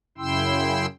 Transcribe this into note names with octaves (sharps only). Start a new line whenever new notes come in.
F#2 C#3 E4 G5 C6 E6